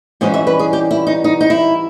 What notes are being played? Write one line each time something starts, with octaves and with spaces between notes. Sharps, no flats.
G#2 E3 G3 C#4 D#5
E5
B4
G#4
G4
E4
D#4
D#4
D#4
E4